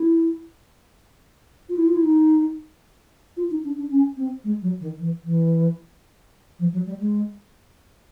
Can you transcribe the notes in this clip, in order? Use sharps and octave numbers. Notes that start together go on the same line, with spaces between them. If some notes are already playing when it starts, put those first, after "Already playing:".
Already playing: E4
F4
E4
F4
E4
D#4
F4
D#4
D4
D4
C#4
C4
G#3
F#3
D#3
E3
E3
F3
F#3
G3
G#3